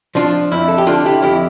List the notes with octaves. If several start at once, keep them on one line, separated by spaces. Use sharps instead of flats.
F3 D4 F4
F2 E4
A4
G4
D3 D4 F4
E4 G4
F2 E4 G4